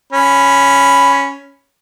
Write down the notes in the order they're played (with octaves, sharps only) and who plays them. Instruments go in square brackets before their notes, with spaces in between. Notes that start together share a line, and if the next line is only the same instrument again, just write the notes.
[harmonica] C#4 B5